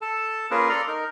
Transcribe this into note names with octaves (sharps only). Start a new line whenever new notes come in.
A4 A5
A#3 C#4 F4 G#4 A#4 B4
A4 D5 A#5 C6
D#4 A#4